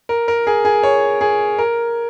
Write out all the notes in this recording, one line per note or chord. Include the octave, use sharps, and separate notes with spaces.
A#4
A#4
G#4
G#4
C#5
G#4
A#4